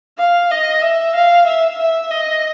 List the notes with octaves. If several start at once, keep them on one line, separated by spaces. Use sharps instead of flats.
F5
D#5
E5
F5
E5
E5
D#5